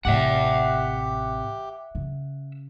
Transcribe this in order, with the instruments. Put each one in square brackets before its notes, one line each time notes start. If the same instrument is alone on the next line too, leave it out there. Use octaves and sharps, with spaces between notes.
[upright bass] A1 C3 [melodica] G4 [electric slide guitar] E5 F#5
[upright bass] C#3